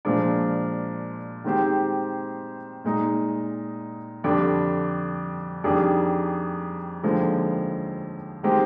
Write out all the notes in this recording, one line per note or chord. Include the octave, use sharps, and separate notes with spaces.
A#2 F3 G#3 D4
D#3 G#3 C4 G4 C5
A#2 G#3 D#4
F2 D3 G3 D4
F2 D#3 G3 D4 G#4
D#2 D3 F3 G#3
D#3 G#3 C4 G4